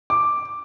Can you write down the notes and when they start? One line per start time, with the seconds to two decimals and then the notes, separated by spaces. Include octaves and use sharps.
0.10 D6